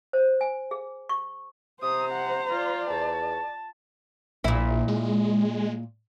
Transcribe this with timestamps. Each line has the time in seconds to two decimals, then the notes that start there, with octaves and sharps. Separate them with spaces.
0.13 C5
0.41 G#5
0.71 G#4
1.09 C#6
1.83 C3 C5 A#5 D#6
2.12 F#5
2.50 F4 D5
2.90 E2 A5
4.44 A#1 A#2 E4
4.88 G#3